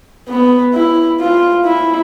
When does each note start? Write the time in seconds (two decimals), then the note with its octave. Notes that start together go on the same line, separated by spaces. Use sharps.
0.29 B3
0.74 E4
1.21 F4
1.65 E4